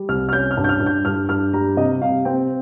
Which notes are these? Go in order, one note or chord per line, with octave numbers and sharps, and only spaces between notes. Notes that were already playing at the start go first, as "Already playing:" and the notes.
Already playing: G3
C2 F6
F6
C#4 G6
F6
G2
G6
F6
G2
G6
G2 F6
G2 F6
G3 A#5
C3 D#5
C3 F5
C4 G5